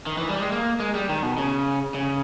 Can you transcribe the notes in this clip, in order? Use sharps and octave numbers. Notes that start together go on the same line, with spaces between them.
D#3
E3
G3
G#3
A#3
G#3
G3
D#3
B2
C#3
C#3